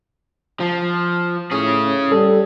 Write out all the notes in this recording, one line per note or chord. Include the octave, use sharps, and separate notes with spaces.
F3
A2 C#4 G#4
G3 A4